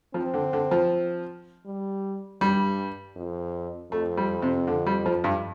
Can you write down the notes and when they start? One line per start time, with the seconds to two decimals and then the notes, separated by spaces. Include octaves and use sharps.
0.14 F3 C4
0.34 D3
0.53 D3
0.71 F3
1.66 G3
2.41 G2 G3
3.16 F2
3.92 F2 A3
4.17 G3
4.42 C3
4.67 D3
4.86 G3
5.06 F3
5.24 G2